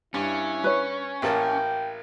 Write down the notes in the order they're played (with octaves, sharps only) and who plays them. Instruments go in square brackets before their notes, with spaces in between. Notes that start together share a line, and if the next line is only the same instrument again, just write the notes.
[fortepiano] G2 [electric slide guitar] C#4 [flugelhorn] E4
[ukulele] B4 C#5
[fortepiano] A1 A#3 A5 [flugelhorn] G5